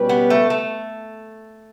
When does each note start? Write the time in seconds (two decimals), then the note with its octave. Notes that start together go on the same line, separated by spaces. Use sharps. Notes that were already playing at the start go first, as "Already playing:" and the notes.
Already playing: B2 G3 C#4 G4 B4
0.09 B3
0.30 A3
0.50 A3